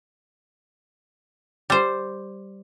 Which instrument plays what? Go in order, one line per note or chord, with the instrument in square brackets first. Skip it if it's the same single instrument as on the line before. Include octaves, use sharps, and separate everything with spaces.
[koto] G3 C5